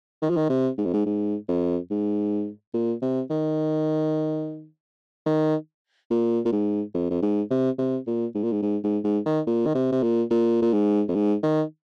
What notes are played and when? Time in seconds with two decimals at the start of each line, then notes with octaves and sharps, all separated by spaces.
0.22 D#3
0.30 F3
0.37 D#3
0.50 C3
0.78 G#2
0.85 F2
0.93 G#2
1.06 G#2
1.48 F2
1.90 G#2
2.74 A#2
3.02 C3
3.30 D#3
5.26 D#3
6.10 A#2
6.45 A#2
6.52 G#2
6.94 F2
7.10 F2
7.22 G#2
7.50 C3
7.78 C3
8.06 A#2
8.35 G#2
8.43 A#2
8.52 G#2
8.62 G#2
8.84 G#2
9.04 G#2
9.26 D#3
9.47 A#2
9.66 D#3
9.75 C3
9.92 C3
10.03 A#2
10.30 A#2
10.62 A#2
10.73 G#2
11.08 F2
11.15 G#2
11.43 D#3